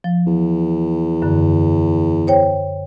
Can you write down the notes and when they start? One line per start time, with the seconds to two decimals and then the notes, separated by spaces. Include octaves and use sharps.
0.04 F3
0.26 E2
1.22 F#2 D3
2.27 C5 C#5 G5